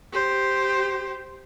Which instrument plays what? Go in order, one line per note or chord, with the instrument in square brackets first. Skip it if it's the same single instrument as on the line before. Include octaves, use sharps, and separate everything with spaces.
[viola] G4 C5